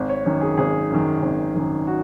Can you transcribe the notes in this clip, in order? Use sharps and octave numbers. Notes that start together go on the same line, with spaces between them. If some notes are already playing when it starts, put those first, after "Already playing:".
Already playing: G#1
C#5
F#2 D#3
G#4
G#1 G#4
F#2 D#3
G#1
F#2 D#3
F#4